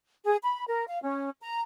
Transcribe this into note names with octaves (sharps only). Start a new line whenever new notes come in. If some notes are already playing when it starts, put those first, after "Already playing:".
G#4
B5
A#4
F5
C#4
A#5